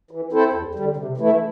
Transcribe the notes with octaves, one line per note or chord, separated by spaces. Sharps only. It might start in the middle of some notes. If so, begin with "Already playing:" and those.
E3
C4 E4 A4 C5
E2
D3 G3
C3
E3 A3 E4